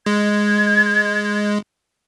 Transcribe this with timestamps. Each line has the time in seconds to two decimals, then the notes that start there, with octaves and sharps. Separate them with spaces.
0.06 G#3 G#6